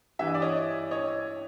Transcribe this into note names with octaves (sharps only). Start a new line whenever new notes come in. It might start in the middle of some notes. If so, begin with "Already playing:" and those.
G2 E3 E5
D#5
D5
C#5 D#5
C#5 D#5